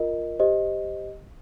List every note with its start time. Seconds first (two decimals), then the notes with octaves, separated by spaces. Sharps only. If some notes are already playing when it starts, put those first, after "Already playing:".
Already playing: F4 A#4 D#5
0.39 G4 C5 D#5